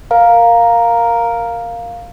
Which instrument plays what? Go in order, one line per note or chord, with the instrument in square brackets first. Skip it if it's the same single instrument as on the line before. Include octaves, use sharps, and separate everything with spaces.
[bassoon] A#4 [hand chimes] F5